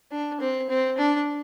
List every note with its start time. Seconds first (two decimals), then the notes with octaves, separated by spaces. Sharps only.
0.12 D4
0.41 C4
0.70 C4
0.98 D4